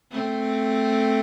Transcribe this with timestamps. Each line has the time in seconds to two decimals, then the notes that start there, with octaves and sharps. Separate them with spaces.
0.11 A3 C4